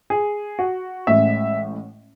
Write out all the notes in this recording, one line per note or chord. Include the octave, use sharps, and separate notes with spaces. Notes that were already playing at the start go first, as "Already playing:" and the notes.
G#4
F#4
A1 A2 G#3 C#4 E5